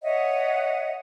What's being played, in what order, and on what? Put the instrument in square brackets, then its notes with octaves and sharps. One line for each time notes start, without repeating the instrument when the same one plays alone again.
[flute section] C#5 D#5 E5 F#5